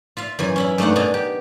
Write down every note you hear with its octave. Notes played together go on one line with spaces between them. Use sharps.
F4 E5 F5
F#2 E3 G#5
C#4 E4 B5
G2 A3 A#3 D#4 F#5
B2 D4 D#5 G#5 A#5
G4